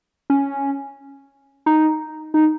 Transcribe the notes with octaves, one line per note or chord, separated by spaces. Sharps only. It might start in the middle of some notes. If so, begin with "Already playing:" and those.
C#4
D#4
D#4